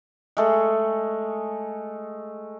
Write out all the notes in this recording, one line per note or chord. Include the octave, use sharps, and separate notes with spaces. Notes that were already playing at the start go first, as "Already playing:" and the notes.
G#3 A3 G#4